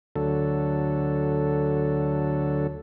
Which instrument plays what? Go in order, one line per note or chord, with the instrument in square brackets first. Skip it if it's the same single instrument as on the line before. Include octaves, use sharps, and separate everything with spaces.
[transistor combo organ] D2 D3 F#3 A4